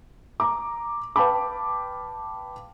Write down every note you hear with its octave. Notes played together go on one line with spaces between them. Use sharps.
A#5 D6
B4 F5 G5 A5 B5 D6